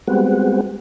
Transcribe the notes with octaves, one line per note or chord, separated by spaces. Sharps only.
G3 G#3 B3 C4 F#4